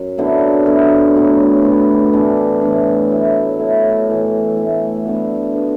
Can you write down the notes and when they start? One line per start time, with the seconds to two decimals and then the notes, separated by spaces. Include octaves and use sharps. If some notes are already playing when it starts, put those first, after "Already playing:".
Already playing: F#2
0.18 D3 F#3 B3 E4
0.66 D3 F#3 B3 E4
1.15 A2 F#3 B3
1.64 A2 F#3 B3
2.13 A2 E3 B3 D4
2.61 A2 E3 B3 D4
3.11 F#3 A3 E4
3.59 F#3 A3 E4
4.08 A2 E3 A3 E4
4.57 A2 E3 A3 E4
5.06 D3 B3 F#4
5.55 D3 B3 F#4